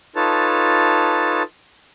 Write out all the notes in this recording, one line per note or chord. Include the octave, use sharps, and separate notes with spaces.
D#4 F4 A4 B4 C#5 A5